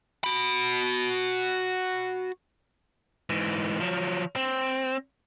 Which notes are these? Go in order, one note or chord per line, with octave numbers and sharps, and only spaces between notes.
F#4 B5
G#2 E3
F3 F#3
C4